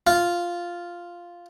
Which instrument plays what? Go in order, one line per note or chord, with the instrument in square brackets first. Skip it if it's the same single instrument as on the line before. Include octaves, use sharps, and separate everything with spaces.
[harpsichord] F4